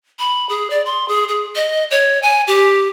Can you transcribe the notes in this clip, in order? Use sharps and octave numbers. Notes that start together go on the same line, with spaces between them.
B5
G#4
D5
C6
G#4
G#4
D#5
C#5
G#5
G4